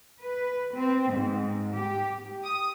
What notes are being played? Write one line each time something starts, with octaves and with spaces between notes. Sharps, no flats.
B4
C4
G#2
G4
D#6